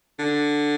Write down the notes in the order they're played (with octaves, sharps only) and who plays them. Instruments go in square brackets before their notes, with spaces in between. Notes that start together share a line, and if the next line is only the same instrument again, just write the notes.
[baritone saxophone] D3